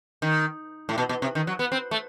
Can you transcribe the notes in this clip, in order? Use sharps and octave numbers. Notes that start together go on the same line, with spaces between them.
D#3
A2
B2
B2
C3
D#3
F#3
B3
C4
A3